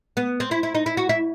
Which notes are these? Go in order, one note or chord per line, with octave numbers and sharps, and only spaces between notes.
B3
C4
E4
E4
D#4
E4
F#4
E4